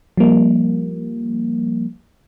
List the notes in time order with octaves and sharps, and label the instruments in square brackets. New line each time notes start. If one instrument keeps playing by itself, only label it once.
[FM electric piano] F3 G3 A#3